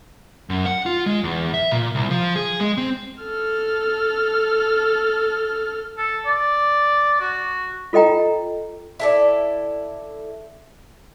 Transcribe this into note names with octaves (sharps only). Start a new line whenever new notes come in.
F#2
F#5
F4
G#3
E2
E5
A#2
C2
F3
G#4
G#3
C4
A4 F6
A4
D5
F#4
F4 A4 D#5 G5 A#5
E4 A4 D5